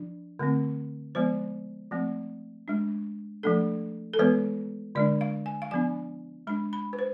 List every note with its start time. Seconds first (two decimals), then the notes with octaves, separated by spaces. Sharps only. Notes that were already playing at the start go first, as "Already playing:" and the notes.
Already playing: F3 D4
0.39 D3 A3 C4
1.15 F3 G#3 B3 C5
1.91 F3 A3 C4
2.68 G#3 D4
3.43 F3 A3 D4 A4
4.14 A4
4.19 E3 G#3 B3 B4
4.95 D3 G#3 D4 D5
5.21 F5
5.46 G#5
5.62 F5
5.71 F3 B3 D4 G#5
6.47 G#3 D4 B5
6.73 B5
6.93 B4
6.99 C5